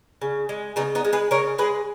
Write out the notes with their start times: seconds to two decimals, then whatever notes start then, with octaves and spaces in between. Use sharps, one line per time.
0.22 C#3
0.49 G#3
0.76 C#3 B3 D#4
0.95 B3 D#4
1.05 G#3
1.13 G#4 B4
1.31 C#3 A#4 C#5
1.58 G#3 G#4 B4